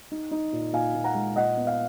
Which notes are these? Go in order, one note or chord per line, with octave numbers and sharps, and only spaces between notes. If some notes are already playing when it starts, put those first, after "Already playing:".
D#4
D#4
A#2
A#2 F5 G#5
A#2
F#5 A#5
G#3
A#2 D#5 F#5
B3
F5